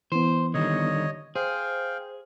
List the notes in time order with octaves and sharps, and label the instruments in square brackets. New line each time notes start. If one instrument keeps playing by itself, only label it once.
[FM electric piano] E3 B3 [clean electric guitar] C5
[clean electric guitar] D3 D#3 G3 [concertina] C#5 D#5
[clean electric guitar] G#4 [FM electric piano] C5 [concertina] F5 G5